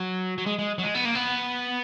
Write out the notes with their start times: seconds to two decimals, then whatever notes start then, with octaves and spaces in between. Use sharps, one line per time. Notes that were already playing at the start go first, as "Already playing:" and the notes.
Already playing: F#3
0.38 F#3
0.46 G#3
0.58 G#3
0.78 F#3
0.83 G#3
0.95 B3
1.05 A#3
1.15 B3